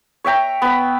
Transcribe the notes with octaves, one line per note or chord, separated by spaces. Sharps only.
C#5 E5 G5 A#5
B3 B5